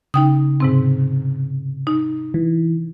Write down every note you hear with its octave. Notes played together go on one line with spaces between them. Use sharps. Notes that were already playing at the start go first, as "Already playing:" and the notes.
C#3 D#4 G5 D#6
G#2 C3 C4
D#4
E3